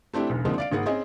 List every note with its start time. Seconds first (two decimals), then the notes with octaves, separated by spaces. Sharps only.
0.13 A3 C4 D4 E4 G4
0.29 E1 B1
0.45 D3 F3 G#3 A#3 C4 D#4
0.58 D5 F5 D7
0.71 G#1 A#3 G#4 F#5
0.86 C4 C#4 G#4 D#5 G#5